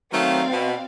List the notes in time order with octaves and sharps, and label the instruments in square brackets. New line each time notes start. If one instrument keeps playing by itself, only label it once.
[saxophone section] D#3 F#3 A3 [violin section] C4 D5 F5
[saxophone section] B2